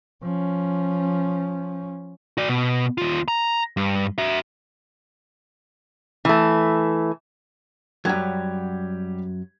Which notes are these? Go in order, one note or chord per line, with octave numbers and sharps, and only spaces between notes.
F3 C#4
F#4 D5
B2
D#2 F4
A#5
G2
F#4 E5
E3 A3
F#2 F#3 G3 G4 G#6